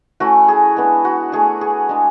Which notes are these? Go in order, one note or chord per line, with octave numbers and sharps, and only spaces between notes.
A3 C#4 E4 F#4
G#4
G#3 B3 D4
F#4
A3 D4 G#4
G#4
G#3 D4